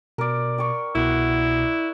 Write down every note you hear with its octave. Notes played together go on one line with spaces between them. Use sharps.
B2 A#4 D5
G5 C#6
C2 B2 E4 F#5